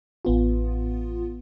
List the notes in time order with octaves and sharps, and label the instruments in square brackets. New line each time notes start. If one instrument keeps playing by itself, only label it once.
[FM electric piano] A1 B3 F4